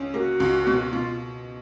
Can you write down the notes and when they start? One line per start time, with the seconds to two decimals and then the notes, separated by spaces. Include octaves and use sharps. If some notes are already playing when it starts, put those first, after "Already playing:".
Already playing: C#2 C#4
0.13 A#3 F#4 G#4
0.40 C#2
0.67 B2
0.93 B2 F4